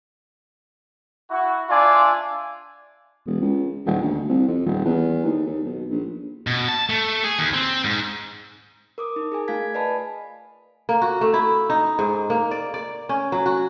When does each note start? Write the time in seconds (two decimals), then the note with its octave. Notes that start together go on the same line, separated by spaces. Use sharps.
1.30 E4 F#4
1.69 D4 F4 D5 E5 G#5
3.26 E1
3.41 C#2
3.86 D#1
4.01 D2
4.29 C2
4.48 F2
4.66 D#1
4.85 E2
5.25 D#2
5.46 D#2
5.65 B1
5.90 A#1
6.47 B2
6.69 A5
6.90 A3
7.24 G#4
7.39 D#2
7.53 C4
7.84 G#2
8.98 A#4 D6 D#6
9.16 D#4
9.32 G#4 A#4 G#5
9.48 A3 F4 F5 G#5 G#6 B6
9.74 B4 D5 D#5 G#5 A5 B5
10.89 A#3
11.02 F#4
11.21 A3
11.34 E4
11.70 D#4
11.99 G#2
12.30 A#3
12.51 D5
12.74 D5
13.09 C#4
13.32 F#3
13.46 F#4